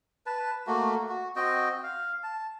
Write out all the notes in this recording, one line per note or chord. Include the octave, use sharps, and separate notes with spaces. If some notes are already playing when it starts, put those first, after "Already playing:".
B4 A5
A3 A#3 F#4
F#4
C4 F#4 D#5 G5
F5
A5